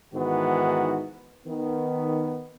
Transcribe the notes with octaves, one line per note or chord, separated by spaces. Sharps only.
G#2 D#3 E3 B3 F#4
D#3 B3